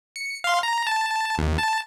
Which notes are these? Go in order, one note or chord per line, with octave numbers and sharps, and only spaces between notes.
C#7
F5 C6
A#5
A5
D#2
A5